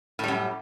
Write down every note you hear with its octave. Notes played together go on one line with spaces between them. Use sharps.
F#2 A2 G3